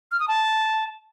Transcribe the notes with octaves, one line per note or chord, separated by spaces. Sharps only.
F6
D#6
A5